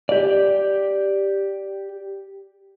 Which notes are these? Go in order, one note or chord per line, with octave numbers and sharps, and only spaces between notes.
G4 D5